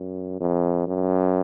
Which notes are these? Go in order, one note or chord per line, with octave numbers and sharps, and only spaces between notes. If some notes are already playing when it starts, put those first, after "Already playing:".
Already playing: F#2
F2
F#2